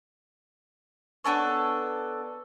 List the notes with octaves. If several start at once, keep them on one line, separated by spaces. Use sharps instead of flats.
B3 D4 A4 C#5